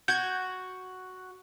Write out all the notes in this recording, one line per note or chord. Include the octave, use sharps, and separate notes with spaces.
F#4 G6 G#6